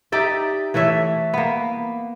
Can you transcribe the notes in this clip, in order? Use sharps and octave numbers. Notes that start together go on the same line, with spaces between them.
D#4 G4 D5 E5
E3 A3 C#5 E5
A#3 B3